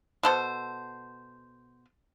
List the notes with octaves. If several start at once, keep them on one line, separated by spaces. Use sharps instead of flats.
B2 A4 C5